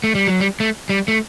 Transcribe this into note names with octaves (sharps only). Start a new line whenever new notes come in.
A3
G3
F#3
G3
A3
G3
A3